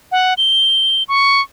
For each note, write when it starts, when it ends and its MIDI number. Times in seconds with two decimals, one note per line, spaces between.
0.12 0.34 78
0.38 1.03 103
1.08 1.42 85